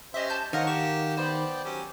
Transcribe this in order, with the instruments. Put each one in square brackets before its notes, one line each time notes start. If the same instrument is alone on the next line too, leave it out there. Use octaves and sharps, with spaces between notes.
[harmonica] C#4 G4 C5 [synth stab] D#5 E5
[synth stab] A5 G6
[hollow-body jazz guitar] D#3 [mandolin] A#4 F5 F#5 [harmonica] C5 C#5 D#5
[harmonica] G4 [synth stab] C#6 E7
[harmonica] B3 D5 G5 [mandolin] C5
[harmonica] F#3 C#4 G4